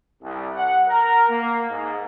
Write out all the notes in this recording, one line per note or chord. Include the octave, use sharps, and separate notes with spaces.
C2
F#5
A#4
A#3
G#2